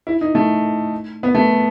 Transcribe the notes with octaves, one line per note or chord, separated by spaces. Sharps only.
E4
D#4
A3
B3
A3